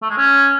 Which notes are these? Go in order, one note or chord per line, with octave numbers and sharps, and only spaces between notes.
A3
G#3
C#4